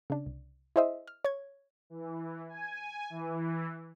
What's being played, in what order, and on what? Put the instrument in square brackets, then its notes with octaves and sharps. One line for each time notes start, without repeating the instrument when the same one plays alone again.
[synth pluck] C#3 D4
C2
E4 G#4 C5 D#5 E5
F6
C#5 G#6
[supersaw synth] E3
G#5
E3